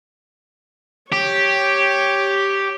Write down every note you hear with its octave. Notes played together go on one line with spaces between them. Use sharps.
G4 C#5